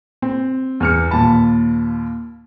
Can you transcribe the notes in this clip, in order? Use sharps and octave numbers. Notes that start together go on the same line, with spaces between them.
C4
E2 F6 C#7
D#2 A#2 A5 B5